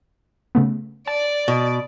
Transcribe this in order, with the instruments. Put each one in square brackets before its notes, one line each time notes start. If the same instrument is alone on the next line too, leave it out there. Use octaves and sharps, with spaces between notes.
[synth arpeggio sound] C#3 A3 B3
[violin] D5 [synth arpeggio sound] A5
[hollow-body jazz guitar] B2